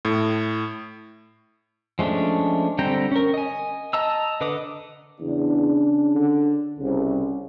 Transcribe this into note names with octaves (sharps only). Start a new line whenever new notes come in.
A2
F3 G#3 A3 C#4 D4
D3 G3 C4 G5 A#5
C#4 A#4
D#5 G#5
D#5 A5 A#5 E6
D3 B4 D#5 D6 D#6
E2 C#3 C#4 D4
D3
C2 C#3